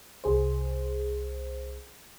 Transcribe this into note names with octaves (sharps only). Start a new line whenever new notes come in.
C2 G#4 C5